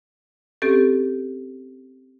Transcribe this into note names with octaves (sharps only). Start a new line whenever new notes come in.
C4 C#4 G4 A4